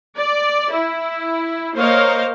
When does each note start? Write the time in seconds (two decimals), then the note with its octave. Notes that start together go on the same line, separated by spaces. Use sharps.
0.18 D5
0.72 E4
1.76 A#3 A#4 C5 C#5 D#5 F5